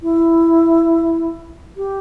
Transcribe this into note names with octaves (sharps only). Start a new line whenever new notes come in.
E4
G4